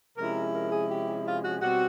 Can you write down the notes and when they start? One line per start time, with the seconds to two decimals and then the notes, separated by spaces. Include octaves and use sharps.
0.18 C3 F3 G#3 C#4 E4 A#4
0.54 A#4
0.72 G#4
0.89 G4
1.25 F4
1.43 F#4
1.61 B2 G3 C4 F#4